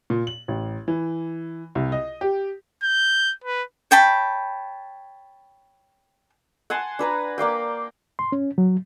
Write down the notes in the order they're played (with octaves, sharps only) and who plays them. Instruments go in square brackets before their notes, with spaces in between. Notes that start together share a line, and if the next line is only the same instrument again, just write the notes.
[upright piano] A#2
F#7
A1
E3
C2
D#5
G4
[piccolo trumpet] G6
B4
[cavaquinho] C#5 G5 A5 B5
[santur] F#5 G#5 A5 C6
D4 B4 A#5
A#3 D5 F5 G5
[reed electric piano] C6
C#4
F#3